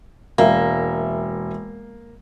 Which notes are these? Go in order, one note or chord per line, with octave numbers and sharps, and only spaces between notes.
E1 A#3 E5